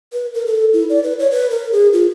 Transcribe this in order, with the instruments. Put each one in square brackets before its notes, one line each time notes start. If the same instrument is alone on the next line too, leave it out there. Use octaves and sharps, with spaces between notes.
[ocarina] B4
A#4
A4
E4
D5
B4
C#5
B4
A#4
G#4
F4